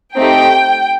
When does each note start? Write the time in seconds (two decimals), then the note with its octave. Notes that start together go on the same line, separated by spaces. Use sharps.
0.16 A3 C4 D#4 G4 G5